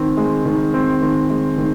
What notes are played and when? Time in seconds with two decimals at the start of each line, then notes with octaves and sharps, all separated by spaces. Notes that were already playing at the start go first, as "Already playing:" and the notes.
Already playing: D#3 C4
0.17 G#3
0.45 D#3
0.74 C4
1.02 D#3
1.30 G#3
1.58 D#3